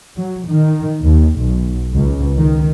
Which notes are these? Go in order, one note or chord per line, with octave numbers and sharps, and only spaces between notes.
F#3
D#3
D#2
B1
C#2
D#3